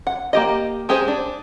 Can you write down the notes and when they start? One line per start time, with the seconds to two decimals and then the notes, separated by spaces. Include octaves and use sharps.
0.07 F#5
0.33 A#3 G4 D#5
0.89 G#3 G4 G#4 C5
1.08 D4